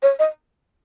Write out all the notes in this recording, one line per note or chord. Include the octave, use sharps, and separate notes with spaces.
C#5
D#5